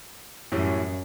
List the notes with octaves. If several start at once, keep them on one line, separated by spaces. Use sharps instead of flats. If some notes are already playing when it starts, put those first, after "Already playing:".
F#2 A2 E3 G3 C#4 E4